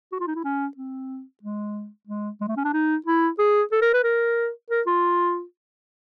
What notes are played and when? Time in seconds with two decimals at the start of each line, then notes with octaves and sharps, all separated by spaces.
0.12 F#4
0.20 F4
0.27 D#4
0.35 E4
0.44 C#4
0.77 C4
1.43 G#3
2.07 G#3
2.41 G#3
2.48 A3
2.57 C#4
2.64 D4
2.73 D#4
3.06 E4
3.39 G#4
3.72 A4
3.82 A#4
3.93 B4
4.03 A#4
4.70 A#4
4.86 F4